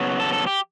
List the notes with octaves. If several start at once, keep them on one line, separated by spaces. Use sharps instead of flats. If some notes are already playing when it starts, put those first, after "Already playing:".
Already playing: C#3 F#3 B3
A4
A4
G4